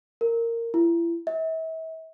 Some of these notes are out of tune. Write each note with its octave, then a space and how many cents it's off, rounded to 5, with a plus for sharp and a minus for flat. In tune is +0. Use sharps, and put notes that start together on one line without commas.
A#4 -15
E4 +40
E5 -40